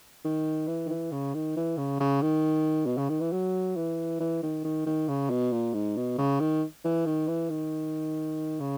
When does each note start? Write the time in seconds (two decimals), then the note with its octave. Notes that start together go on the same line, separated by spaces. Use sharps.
0.24 D#3
0.68 E3
0.86 D#3
0.90 E3
1.12 C#3
1.34 D#3
1.56 E3
1.78 C#3
2.00 C#3
2.22 D#3
2.86 B2
2.98 C#3
3.10 D#3
3.21 E3
3.32 F#3
3.76 E3
4.20 E3
4.43 D#3
4.64 D#3
4.86 D#3
5.08 C#3
5.30 B2
5.52 A#2
5.74 G#2
5.97 B2
6.18 C#3
6.40 D#3
6.85 E3
7.06 D#3
7.28 E3
7.50 D#3
8.60 C#3